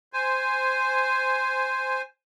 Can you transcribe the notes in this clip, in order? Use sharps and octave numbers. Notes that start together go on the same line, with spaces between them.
C5 G#5